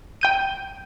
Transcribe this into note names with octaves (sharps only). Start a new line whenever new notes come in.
G5 G6 D#7